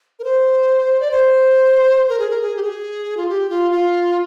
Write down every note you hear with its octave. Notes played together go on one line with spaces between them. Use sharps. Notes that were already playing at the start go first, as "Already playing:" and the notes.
A#4
C5
D5
C5
A#4
G#4
A#4
G#4
G4
G#4
F4
G4
F4
F4